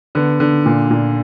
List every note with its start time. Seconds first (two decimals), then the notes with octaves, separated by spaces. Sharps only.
0.15 D3 B3
0.40 D3
0.66 A#2
0.91 A#2